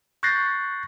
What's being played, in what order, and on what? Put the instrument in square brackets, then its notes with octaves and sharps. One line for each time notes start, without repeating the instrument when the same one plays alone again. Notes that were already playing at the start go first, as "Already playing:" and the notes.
[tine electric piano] C#6 F#6 G6 A6 A#6 C7